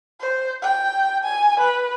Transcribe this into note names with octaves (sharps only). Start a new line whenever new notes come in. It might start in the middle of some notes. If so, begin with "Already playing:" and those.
C5
G5
G#5
B4